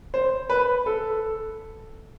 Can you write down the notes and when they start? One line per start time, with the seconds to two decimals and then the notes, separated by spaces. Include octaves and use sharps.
0.14 C5
0.50 B4
0.86 A4